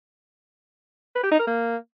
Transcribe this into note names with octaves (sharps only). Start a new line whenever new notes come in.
B4
G4
D#4
A#4
A#3